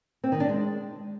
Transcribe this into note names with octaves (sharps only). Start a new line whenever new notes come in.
C4
D#3
D4
G#3